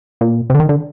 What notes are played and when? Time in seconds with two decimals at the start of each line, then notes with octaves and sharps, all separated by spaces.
0.21 A#2
0.50 C3
0.54 D3
0.60 D#3
0.69 D3